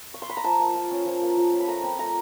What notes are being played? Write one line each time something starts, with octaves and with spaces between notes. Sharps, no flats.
C#6
C6
B5
A#5
F3 A5
A#3
F4
C#4
F3
A#3
F3
C#4
B5
A3 A#5
C4 B5
A3 A#5